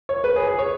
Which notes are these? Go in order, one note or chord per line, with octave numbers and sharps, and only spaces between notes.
C#5
B4
G#4
G#4
C#5